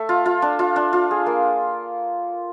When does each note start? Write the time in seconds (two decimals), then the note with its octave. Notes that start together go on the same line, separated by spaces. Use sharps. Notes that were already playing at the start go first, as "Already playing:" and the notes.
Already playing: A3
0.09 F4
0.26 F4
0.42 D4
0.59 F4
0.76 D4
0.93 F4
1.11 G#4
1.26 A#3